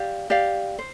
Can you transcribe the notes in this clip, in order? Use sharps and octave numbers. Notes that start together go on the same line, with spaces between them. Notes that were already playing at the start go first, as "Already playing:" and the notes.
Already playing: G4 D5 F5
G4 D5 F5
C5